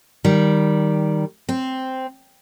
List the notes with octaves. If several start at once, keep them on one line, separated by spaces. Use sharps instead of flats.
D#3 G3
C4